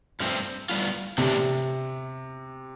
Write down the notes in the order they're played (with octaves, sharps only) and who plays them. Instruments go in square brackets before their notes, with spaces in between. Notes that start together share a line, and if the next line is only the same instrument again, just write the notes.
[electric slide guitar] G2 F3 A3 C4
A2 G3 B3 F4
[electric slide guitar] A2 E3 A3 D4 [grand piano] C3